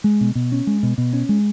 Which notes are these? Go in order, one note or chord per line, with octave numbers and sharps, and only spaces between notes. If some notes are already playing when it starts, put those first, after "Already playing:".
G#3
B2
B2
C#4
G#3
B2
B2
C#4
G#3